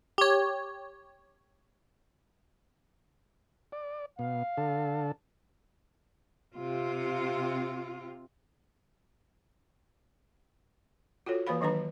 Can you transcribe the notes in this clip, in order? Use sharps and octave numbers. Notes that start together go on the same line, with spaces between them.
G4 C#5
D5
B2 F5
D3 A4
C3 F4
F4 F#4 A4 C#5
E3 A#3 B4 C5 F5 B5
D#3 F#3 D4 B4 A#5